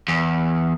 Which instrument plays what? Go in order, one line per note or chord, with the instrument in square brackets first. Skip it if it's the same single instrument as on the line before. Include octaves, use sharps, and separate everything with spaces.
[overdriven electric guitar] E2